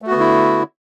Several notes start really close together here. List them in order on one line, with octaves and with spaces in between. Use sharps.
A3 F#4 B3 D3 E4